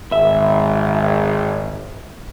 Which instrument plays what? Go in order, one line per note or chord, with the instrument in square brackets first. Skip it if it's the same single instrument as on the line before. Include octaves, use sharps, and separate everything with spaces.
[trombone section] G#1 [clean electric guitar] E5